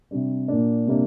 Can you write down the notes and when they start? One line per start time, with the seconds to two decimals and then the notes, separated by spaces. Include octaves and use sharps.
0.11 C3 G3 D4
0.48 A#2 A#3 D4
0.87 C3 G3 A#3 D4